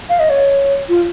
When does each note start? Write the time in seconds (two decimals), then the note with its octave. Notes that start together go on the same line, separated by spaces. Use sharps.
0.09 F5
0.19 D#5
0.29 C#5
0.89 F4